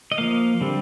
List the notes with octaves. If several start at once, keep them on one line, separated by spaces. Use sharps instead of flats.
D#5
F3 A#3 F5
D3 G3 C4